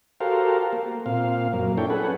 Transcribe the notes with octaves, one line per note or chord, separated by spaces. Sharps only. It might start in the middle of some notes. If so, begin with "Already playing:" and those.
F#4 G4 A4 A#4 C5 F5
A#3
A#2 C4 F5
F#2 A#3
D4 E4 A4 C#5 G5
C#4 G#4 A4 B4 F#5